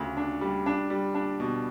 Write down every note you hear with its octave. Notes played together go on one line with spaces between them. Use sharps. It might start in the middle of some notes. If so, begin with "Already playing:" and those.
Already playing: D2 C#3
D4
G3
D4
G3
D4
B2